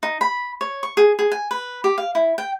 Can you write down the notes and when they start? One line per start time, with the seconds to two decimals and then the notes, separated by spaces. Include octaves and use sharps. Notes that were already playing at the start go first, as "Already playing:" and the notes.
0.03 D#4
0.21 B5
0.61 C#5
0.83 C#6
0.97 G#4
1.19 G#4
1.32 G#5
1.51 B4
1.84 G4
1.98 F5
2.15 E4
2.38 G5